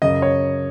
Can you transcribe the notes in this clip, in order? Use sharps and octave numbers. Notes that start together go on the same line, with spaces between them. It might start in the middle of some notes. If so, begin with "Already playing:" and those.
F#2 C#3 D#5
C#5